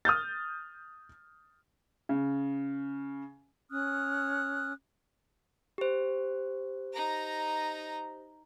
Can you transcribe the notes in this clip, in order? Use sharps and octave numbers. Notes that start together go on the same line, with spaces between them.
D#6 F6 G6 A6
C#3
C#4 D#6 F6 F#6
G4 C5
D#4 A#5